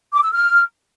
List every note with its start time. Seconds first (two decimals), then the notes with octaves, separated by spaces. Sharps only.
0.14 D6
0.23 E6
0.32 F6